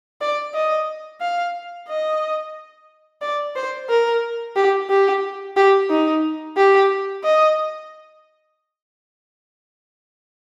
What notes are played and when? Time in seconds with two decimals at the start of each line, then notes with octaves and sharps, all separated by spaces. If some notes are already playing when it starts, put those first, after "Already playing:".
0.21 D5
0.54 D#5
1.21 F5
1.89 D#5
3.22 D5
3.56 C5
3.90 A#4
4.56 G4
4.90 G4
5.56 G4
5.90 D#4
6.57 G4
7.24 D#5